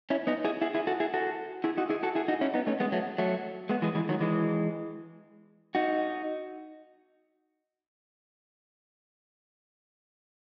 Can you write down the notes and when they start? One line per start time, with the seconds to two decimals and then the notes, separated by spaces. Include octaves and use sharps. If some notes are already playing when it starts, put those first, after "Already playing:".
0.10 C#4 E4
0.27 B3 D#4
0.45 E4 G#4
0.62 E4 G#4
0.75 E4 G#4
0.87 F#4 A4
1.00 E4 G#4
1.14 F#4 A4
1.64 E4 G#4
1.77 D#4 F#4
1.90 E4 G#4
2.03 F#4 A4
2.15 E4 G#4
2.28 D#4 F#4
2.41 C#4 E4
2.54 B3 D#4
2.67 A3 C#4
2.80 G#3 B3
2.92 F#3 A3
3.18 F#3 A3
3.69 G#3 B3
3.82 E3 G#3
3.95 E3 G#3
4.09 D#3 F#3
4.21 E3 G#3
5.75 D#4 F#4